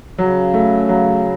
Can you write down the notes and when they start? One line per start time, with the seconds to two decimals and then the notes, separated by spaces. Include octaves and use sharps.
0.18 C#3 F#3
0.54 A3
0.89 F#3